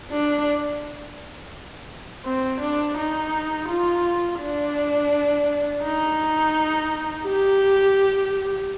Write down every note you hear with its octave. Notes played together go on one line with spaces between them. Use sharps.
D4
C4
D4
D#4
F4
D4
D#4
G4